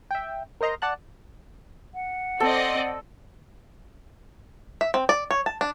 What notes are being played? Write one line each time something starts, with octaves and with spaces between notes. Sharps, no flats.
E5 G5
A#4 C5 D#5 A#5 C6
D5 F#5 A5 F#6
F#5
C4 A4 D5 D#5
E5
C4
D5
C#5
A5
D4